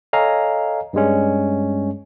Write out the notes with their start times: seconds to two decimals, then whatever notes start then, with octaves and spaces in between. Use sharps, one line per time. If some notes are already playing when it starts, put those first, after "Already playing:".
0.13 A4 C#5 D#5 F5 G#5 A#5
0.93 G2 G3 G#3 C#4